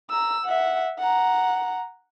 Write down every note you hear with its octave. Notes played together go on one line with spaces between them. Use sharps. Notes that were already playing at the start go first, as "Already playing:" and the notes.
A#5 E6
E5 F#5
F#5 A#5